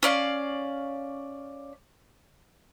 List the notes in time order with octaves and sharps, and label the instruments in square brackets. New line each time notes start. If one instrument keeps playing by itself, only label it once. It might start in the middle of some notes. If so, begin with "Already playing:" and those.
[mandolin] C#4 D5 F5